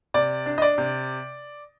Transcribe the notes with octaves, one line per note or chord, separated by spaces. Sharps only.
C3 D5
D4
D#5
D5
C3